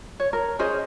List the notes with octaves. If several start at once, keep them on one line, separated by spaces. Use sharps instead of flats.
C#5
A#4
C#4 G#4 C5 D#5